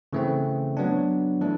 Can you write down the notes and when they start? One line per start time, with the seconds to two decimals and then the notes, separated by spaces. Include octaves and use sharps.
0.13 C#3 E3 A3 C4
0.77 F#3 B3 D4
1.41 E3 A3 D4